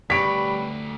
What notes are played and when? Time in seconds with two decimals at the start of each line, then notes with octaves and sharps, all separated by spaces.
0.10 D2 G3 B4 C#5 B5 B6 D7